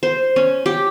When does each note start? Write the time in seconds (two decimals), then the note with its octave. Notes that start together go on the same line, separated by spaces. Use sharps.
0.03 C5
0.36 C#4
0.66 G4